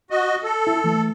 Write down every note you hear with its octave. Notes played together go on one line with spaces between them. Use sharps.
F#4 D#5
A4
E4
E3 A3